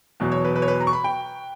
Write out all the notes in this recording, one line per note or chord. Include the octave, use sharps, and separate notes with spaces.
E2 B2 F#3
C#5
B4
B4
C#5
B4
A#5
C#6
B5
G5